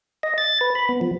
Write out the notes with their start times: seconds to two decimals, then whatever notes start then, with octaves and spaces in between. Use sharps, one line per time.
0.23 D#5
0.38 A6
0.61 B4
0.75 B5
0.89 B3
1.01 F3